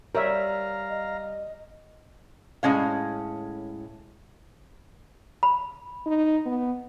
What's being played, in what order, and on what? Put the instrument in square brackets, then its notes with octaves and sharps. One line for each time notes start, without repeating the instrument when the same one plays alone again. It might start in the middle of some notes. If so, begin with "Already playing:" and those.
[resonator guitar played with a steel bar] G3 [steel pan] A#4 C#5 E5 [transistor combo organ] F5 A#5
[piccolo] D#5
[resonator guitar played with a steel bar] A2 G#3 C#4 F5
[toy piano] B5
[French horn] D#4
B3